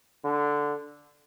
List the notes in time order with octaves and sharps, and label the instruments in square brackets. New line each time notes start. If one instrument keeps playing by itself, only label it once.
[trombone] D3